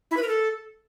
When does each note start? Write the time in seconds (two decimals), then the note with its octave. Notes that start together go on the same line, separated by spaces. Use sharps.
0.11 E4
0.17 B4
0.22 A#4
0.28 A4